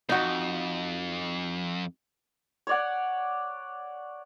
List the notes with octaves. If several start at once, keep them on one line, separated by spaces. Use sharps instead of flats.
F2 D#4 F#4
C#5 D5 F#5